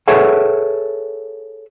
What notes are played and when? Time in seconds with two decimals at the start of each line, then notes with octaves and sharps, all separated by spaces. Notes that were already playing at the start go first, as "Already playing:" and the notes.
0.08 G#4 A4 B4 C#5 E5 F#5